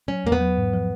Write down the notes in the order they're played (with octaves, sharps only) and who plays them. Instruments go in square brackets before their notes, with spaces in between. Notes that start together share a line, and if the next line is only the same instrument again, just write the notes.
[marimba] F#3 [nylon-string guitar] C#4
[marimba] E2 [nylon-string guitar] A#3
[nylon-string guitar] B3
[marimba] F#3
G#2
F3